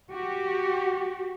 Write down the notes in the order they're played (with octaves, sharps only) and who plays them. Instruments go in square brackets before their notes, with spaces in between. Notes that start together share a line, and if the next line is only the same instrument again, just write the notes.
[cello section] F#4 G4